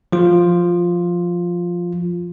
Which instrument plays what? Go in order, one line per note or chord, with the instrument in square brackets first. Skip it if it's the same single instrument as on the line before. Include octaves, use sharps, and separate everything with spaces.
[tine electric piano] F3 F4